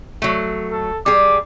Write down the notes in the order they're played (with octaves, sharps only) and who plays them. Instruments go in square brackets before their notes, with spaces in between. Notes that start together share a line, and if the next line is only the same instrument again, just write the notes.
[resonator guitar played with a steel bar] F#3 A3
[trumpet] A4
[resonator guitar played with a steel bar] G3 G#4 [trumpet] D6